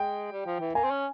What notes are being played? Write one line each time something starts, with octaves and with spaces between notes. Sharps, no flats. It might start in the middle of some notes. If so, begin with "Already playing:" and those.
Already playing: G#3 G5
G3
F3
E3
A#3 G#5
C4
C#4